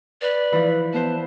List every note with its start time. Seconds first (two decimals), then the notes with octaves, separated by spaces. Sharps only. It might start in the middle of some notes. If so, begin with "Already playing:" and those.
0.22 B4 D5
0.52 E3 F3
0.94 B3 B4 C5 A5